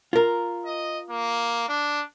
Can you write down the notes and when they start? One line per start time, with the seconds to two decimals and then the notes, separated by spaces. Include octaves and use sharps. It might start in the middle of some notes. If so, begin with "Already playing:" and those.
0.13 F4 A#4
0.66 D#5
1.10 A#3
1.69 D4